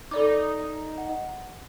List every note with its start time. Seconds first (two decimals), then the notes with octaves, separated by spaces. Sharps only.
0.11 D#4 A4 D5 D6
0.98 F#5